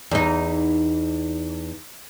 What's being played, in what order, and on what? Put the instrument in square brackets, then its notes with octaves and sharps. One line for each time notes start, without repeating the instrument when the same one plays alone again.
[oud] E2 D#4